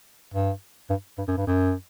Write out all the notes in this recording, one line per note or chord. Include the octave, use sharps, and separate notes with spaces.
G2
G2
G2
F#2
G2
F#2